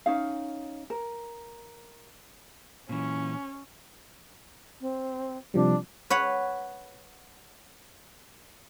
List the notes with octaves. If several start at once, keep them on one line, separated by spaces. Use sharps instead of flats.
C#4 D#4 F5
A#4
A#2 E3 C#4
C4
C3 F3 G3 D4
B4 C#5 F#5